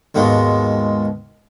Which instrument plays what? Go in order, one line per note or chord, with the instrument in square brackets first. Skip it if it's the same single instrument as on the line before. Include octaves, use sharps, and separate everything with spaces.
[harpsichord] D#2 G#2 B2 G#3